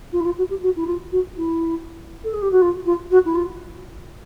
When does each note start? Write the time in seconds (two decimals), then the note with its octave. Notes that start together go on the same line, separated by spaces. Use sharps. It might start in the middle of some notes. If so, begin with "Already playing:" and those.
0.12 F4
0.20 E4
0.25 F4
0.37 F#4
0.49 G4
0.62 F#4
0.76 E4
0.87 F4
1.11 F#4
1.37 E4
2.24 A4
2.33 G#4
2.42 G4
2.51 F#4
2.61 F4
2.85 F4
3.10 F#4
3.25 E4
3.35 F4